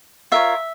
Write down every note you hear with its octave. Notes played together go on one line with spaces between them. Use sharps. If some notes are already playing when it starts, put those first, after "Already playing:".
F4 A#4 C#5 E5